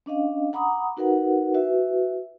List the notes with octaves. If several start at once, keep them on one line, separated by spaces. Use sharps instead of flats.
C#4 D4 D#5 F5
F#5 A#5 B5 D6 D#6
D#4 F#4 A#4 B4 F#5
E4 F#4 B4 E5